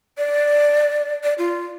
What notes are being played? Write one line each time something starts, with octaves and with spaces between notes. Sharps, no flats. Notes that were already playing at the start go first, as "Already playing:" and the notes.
D5
D5
F4